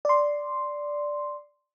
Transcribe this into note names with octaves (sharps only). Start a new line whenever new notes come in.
D5 C6